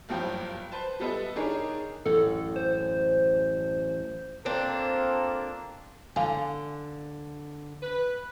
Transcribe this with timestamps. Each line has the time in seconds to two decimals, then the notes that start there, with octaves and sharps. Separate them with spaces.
0.09 F#1 G2 F3 G5
0.72 B4 C5 A5
1.00 G3 B3 A4 B4 D#5 E5
1.36 D#3 D4 D#4 G#4 A#4 C#5
2.05 A1 F#2 A4
2.56 C5
4.45 A#3 C4 D4 F4 A4
6.16 D3 F5 G#5
7.83 B4